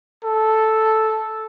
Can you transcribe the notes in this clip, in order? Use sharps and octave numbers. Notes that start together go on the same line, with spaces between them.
A4